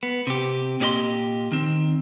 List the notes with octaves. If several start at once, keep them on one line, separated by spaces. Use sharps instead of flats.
B3
C3 G4
A#2 C#4 G4 D5 D#5 C6
D#3 C4